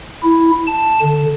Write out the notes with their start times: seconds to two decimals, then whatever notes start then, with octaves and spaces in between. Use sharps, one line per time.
0.23 E4
0.67 A5
1.02 D3